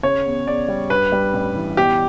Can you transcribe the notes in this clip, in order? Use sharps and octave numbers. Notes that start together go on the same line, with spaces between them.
C#3 C#5
E2
E2 D5
G3
G2 B4
G3
A1
E3
B2 G4